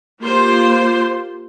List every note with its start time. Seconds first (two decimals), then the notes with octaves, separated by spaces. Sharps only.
0.21 A#3 F4 G4 C5 C6